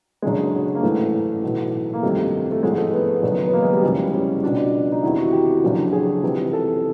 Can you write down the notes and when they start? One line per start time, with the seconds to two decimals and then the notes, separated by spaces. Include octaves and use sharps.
0.22 F#1 F#2 D3 G#3
0.75 A#3
0.83 A1 G#2 E3 A3
1.43 B1 A2 E3
1.94 A#3
2.03 G1 F2 C3 D#3 A3
2.52 A3
2.63 A1 G#2 F3 G#3
2.78 A3
2.93 B3
3.23 F#1 F#2 D#3
3.47 B3
3.53 A#3
3.62 G#3
3.73 G3
3.83 F1 E2 C#3 F3 G#3
3.98 G3
4.13 C#4
4.43 C#2 B2 D4
4.92 D#4
5.03 E2 C3 D#3 E4
5.18 F#4
5.32 G4
5.63 F#1 F#2 D3 F3
5.93 G#4
6.23 C#2 C3 E3
6.53 A4